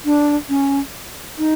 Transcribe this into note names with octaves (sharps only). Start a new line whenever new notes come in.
D4
C#4
D#4